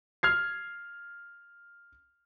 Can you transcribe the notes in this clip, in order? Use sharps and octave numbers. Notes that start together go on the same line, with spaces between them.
F6 G#6 C7